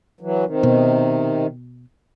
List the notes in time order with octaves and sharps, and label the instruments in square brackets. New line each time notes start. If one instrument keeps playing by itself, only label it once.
[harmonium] E3 F#3
C3 D#3
[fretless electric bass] B2